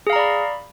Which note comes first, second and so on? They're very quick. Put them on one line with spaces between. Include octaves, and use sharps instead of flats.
G#4 F5 A#5 D5 B5